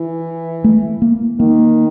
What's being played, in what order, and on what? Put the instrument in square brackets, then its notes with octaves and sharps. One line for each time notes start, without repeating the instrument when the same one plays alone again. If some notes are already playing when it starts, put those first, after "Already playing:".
Already playing: [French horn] E3
[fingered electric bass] A3
A#3
[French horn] D#3 [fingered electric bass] A#3